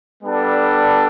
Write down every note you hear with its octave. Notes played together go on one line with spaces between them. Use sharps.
G3 B3 D4 A4